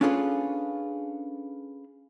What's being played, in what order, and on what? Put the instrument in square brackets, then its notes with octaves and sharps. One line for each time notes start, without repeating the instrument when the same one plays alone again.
[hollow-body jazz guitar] C#4 D4 F4 G#4 A4 B4